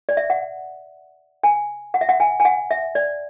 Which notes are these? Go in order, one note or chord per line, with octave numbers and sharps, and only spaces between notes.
D5
E5
F#5
G#5
F#5
E5
F#5
G#5
G#5
F#5
E5
D5